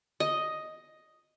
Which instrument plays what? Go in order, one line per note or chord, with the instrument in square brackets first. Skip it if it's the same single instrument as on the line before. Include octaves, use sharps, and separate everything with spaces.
[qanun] D#5